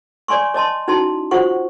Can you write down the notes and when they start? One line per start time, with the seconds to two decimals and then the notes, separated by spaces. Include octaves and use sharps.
0.28 C#5 D5 G#5 C6 C#6
0.54 C#5 D#5 A5 C6
0.88 C#4 D#4 E4 F#4 A5 C6
1.31 F4 F#4 C5 F#5 C#6